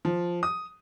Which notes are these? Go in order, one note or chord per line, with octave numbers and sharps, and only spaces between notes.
F3
D#6